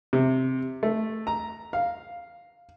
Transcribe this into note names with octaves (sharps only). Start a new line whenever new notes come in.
C3
A3
A#5
F5